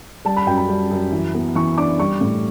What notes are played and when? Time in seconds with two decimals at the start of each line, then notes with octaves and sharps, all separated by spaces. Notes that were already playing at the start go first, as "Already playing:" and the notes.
0.25 G3 A5
0.37 B5
0.47 F#2 G5
0.58 B5
0.69 G3
0.91 F#2
1.12 E3
1.34 B3
1.55 E3 C#6
1.78 D4 D6
1.99 G3 C#6
2.21 A2